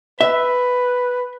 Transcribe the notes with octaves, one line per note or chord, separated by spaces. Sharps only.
B4 E5